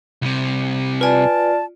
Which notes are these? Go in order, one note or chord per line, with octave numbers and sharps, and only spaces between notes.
C2 C3
F4 B4 D5 G#5 A5